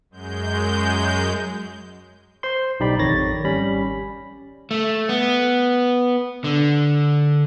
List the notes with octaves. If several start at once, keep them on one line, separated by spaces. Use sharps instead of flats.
F#2 G#3 G6
C5 C6
B1 D#4 G4 D5 B5
A1 F2 D#3 C#5 A6 A#6
G#1 G3 C#4 B5
A3
B3
D3